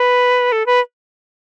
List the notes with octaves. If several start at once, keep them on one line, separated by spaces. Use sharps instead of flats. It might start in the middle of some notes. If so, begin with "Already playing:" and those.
Already playing: B4
A4
B4